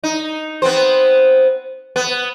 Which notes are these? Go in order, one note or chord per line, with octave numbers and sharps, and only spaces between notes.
D#4
B3 C4 C5
B3